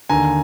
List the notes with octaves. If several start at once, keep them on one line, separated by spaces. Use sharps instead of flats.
D#2 D3 G#5 A#5